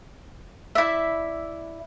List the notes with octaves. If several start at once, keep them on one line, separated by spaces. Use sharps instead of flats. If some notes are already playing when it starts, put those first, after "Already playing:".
E4 D5 E5